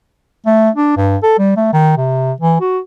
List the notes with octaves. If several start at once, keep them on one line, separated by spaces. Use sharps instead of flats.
A3
D4
G2
A4
G3
A3
D#3
C3
E3
F#4